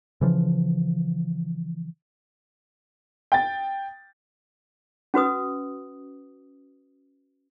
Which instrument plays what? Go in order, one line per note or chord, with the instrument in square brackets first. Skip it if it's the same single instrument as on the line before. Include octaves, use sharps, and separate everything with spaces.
[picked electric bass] C#3 E3 F3
[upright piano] G5 A6
[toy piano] C#4 F#4 B4 D#6